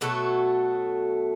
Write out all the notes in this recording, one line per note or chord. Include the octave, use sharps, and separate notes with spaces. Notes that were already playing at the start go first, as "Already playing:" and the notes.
B2 F#3 A3 F#4 A4